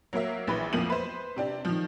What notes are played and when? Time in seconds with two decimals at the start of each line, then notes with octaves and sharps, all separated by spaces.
0.13 F#3 A#3 A#4 E5
0.47 A#1 E3 B4
0.73 F2 B2 F3 A#3 D#7 F#7
0.90 B4 C5
1.36 C3 C4 D4
1.65 D#3 F3